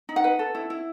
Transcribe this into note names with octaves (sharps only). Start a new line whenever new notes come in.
D#4
F#5
B4
A4
E4
E4